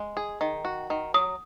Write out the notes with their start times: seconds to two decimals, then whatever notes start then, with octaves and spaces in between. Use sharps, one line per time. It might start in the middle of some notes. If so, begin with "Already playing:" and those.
Already playing: G#3
0.17 G#4
0.41 D#3
0.65 F#4
0.90 D#3
1.14 F#3 D#6